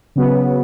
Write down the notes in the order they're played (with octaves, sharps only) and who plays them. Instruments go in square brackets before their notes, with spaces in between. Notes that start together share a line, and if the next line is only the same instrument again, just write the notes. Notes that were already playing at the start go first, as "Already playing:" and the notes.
[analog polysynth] C#3 F#3 B3